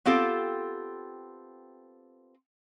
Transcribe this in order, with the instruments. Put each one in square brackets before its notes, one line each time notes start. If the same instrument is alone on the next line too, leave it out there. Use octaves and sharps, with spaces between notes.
[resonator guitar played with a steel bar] B3 C4 F4 G4 A4